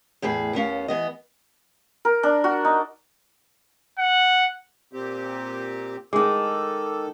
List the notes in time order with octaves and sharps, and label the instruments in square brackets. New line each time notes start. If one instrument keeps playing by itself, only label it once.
[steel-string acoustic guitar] E2 A2 G#4 B4
D#2 B3 C#4 F5
E3 B3 D#5
[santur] A#4
D4
F#4
D#4
[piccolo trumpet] F#5
[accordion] A#2 C4 G4
[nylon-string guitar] D#3 G#3 [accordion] A4 [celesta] D6